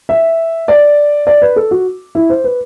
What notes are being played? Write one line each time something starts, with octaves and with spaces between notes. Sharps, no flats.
E5
D5
D5
B4
A4
F#4
E4
C5
B4